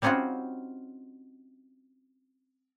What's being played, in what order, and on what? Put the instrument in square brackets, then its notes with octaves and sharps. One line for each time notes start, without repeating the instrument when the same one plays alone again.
[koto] G3 C4 C#4 D#4 F4 F#4